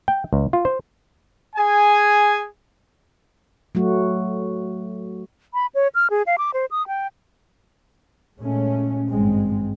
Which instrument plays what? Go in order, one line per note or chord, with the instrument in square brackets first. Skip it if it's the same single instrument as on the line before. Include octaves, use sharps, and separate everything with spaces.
[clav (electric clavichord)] G5
C#2
F4
C5
[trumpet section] G#4 G#5
[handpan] F#3 A3 F#4
[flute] B5
C#5
F6
G#4
F5
D6
C5
D#6
G5
[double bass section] A#2 G#3 A3 C#4
G#1 G2 G#3 C4